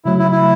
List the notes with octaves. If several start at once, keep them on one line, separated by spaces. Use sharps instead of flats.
C#3 F#3 A3 E4
E4
E4